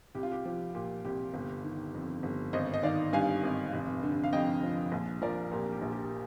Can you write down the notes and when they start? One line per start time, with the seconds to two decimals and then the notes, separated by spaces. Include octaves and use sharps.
0.15 C2 G4
0.23 F4
0.32 G4
0.45 F3 G4
0.74 A#2 G4
1.05 C2 G4
1.34 G1
1.64 D#3
1.95 F2
2.23 G1
2.53 G#1 C5 D#5
2.74 D#5
2.83 D#3 D5 F5
3.13 G2 F5 G#5
3.44 G#1
3.73 F1
4.03 D3
4.24 F5
4.33 F2 D#5 G5
4.63 F3
4.92 A#1
5.22 F3 A#4 D5
5.51 A#2 G4 A#4
5.72 G4
5.82 A#1
5.92 G4